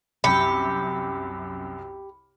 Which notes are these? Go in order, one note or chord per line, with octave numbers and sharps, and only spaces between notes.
C2 F#2 G4 B5 C#7